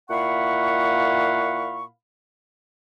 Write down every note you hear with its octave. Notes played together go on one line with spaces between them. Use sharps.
A#2 E4 F5 F#5 B5 C#6